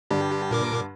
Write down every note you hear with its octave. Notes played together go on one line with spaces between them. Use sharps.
G2 D3 D4 G4
A#2 A#4 D6